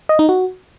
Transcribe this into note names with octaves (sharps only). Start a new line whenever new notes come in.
D#5
D#4
F#4